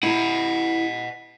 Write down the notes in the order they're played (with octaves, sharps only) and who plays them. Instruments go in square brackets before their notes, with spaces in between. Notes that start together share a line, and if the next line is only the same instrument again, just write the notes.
[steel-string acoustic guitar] E4 A#5 [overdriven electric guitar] D#5 F#5